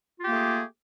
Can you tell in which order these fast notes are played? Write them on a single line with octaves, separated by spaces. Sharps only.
F4 G4 A#3 A3 G#4